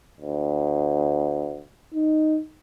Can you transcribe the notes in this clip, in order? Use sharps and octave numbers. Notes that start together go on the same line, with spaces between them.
D2
D#4